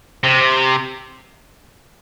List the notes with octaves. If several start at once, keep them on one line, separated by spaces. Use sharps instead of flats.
C3